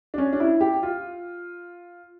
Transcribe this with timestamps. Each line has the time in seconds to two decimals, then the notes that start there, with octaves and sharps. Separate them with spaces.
0.14 D4
0.18 C#4
0.33 D4
0.40 E4
0.61 G4
0.83 F4